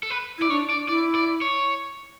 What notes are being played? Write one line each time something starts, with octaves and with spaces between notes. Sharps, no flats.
A4
B4
E4 D5
D4 C#5
D5
E4 D5
D5
C#5